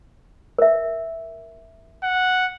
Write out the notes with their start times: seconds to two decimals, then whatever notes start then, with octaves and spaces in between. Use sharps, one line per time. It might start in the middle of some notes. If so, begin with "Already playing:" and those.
0.58 A#4 E5
2.03 F#5